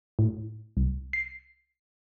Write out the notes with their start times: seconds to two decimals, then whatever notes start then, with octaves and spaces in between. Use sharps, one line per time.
0.19 A2
0.77 C2
1.13 C7